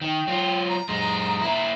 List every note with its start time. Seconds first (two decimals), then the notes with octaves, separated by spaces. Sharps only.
0.01 D#3 G5
0.27 F#3 F4
0.69 A#5
0.89 F#2 G#3
1.42 A#3 E4